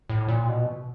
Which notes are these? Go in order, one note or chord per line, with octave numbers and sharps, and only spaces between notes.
A2
A#2
B2